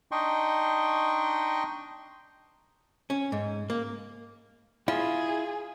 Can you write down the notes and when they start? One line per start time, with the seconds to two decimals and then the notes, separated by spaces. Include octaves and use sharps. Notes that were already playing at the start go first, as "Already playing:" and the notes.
0.12 D4 D#4 D#5 G5 C6 C#6
3.10 C#4
3.32 G#2
3.70 A#3
4.88 E4 F4 G#4 F5